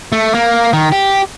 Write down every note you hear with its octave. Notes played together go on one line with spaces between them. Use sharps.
A3
A#3
D#3
G4